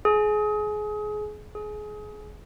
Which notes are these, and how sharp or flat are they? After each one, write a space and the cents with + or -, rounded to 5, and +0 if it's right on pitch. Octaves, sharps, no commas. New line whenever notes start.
G#4 +25
G#4 +25